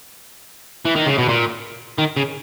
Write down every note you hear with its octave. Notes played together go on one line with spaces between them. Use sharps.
E3
D#3
C#3
B2
A#2
D#3
C#3